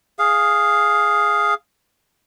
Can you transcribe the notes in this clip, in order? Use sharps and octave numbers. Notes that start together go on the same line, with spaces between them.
G#4 F5